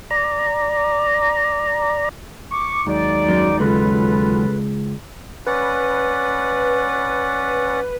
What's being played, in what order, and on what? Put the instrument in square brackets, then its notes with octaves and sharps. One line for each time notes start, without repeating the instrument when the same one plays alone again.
[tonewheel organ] D5 A#5
[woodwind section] C#6 D6
[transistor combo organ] D#2 F#3 G#3 [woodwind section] D#4 D5
[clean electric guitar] F#2
[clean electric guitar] C#2 [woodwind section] F4 A4 B4
[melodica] C#4 D5 F#5 [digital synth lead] B4